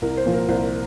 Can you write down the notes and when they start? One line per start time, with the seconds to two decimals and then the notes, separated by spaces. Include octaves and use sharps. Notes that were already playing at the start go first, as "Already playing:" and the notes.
0.02 C2 A#4
0.17 C5
0.26 A#2 F3
0.34 A#4
0.48 C2 C5